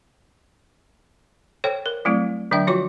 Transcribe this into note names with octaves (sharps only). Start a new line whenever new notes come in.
A4 C5 C#5 G5
A#4
F#3 G3 A3 C4 E4
D3 F#3 D4 E5 G5
F3 F4 F#4 C#5 D6